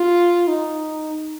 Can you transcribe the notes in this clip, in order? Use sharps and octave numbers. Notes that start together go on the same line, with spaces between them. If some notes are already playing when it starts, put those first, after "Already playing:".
Already playing: F4
D#4